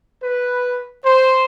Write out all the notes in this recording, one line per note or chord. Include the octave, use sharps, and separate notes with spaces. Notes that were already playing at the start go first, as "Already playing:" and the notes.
B4
C5